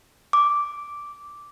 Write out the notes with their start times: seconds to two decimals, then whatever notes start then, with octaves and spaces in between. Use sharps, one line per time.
0.33 D6